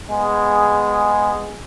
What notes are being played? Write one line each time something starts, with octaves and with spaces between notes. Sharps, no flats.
G#3 B3 G#4